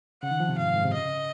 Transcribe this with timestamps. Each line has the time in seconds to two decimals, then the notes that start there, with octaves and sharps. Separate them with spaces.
0.23 C#3 F#5
0.31 D#3
0.40 F3
0.49 C3
0.58 G#2 F5
0.67 F#2
0.76 G#2
0.85 C3
0.93 C#3 D#5